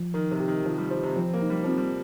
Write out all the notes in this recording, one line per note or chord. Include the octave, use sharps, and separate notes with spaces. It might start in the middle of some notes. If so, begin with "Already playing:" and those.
Already playing: F3
D#3 A#4
C3
G4
D#3
D#3 F3
G3
F3 C5
C3
F3 C4
A#3
D#4
G3
F3 C4
G3